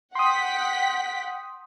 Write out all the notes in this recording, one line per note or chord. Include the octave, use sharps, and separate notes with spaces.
F#5 G5 C6 D#6 B6